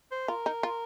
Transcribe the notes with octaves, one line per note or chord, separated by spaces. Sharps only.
C5
F4 A#4
D#4
F4